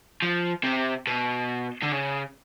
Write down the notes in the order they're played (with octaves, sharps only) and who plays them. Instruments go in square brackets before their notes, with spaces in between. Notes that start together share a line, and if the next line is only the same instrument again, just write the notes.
[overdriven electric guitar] F3
C3
B2
D3
C#3